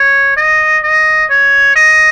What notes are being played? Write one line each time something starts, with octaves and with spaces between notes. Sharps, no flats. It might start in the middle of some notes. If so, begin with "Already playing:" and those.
Already playing: C#5
D#5
D#5
C#5
D#5